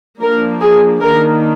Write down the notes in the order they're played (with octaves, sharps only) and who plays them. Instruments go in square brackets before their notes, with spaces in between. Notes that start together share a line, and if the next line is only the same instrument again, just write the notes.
[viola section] F3 A#3 D4 A#4
G#4
D#3 A#3 D4 A#4